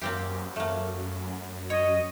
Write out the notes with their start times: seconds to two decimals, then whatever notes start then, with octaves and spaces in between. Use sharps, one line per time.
0.02 F#2 A#3 C4 G4
0.56 A3 A#3
1.70 C#5 D#5